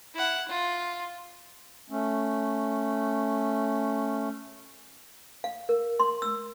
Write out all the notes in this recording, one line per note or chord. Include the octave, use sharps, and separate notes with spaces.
E4 F#5
F4
A3 C#4
F5
A#4
C6
E6